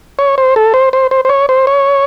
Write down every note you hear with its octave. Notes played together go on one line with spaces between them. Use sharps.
C#5
C5
A4
C5
C5
C5
C5
C#5
C5
C#5